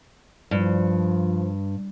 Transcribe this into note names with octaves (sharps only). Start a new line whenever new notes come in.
G2 F3